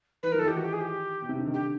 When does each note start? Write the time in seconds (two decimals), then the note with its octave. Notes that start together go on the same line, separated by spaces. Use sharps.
0.23 E3 B4
0.32 F3 A#4
0.39 D#3 A4
0.45 E3
0.48 G4
0.56 D#3 F#4
0.64 G4
0.73 G#4
0.81 G4
1.22 B2
1.29 C3
1.38 D3
1.46 D#3
1.54 D3 G4